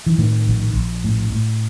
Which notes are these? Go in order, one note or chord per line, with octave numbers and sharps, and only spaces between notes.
E3
A2 D#3
A#1
A#1
A2
A2